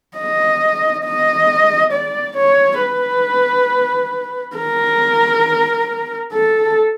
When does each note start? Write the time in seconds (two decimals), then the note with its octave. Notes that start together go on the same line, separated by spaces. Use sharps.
0.18 D#5
1.05 D#5
1.93 D5
2.38 C#5
2.82 B4
4.57 A#4
6.33 A4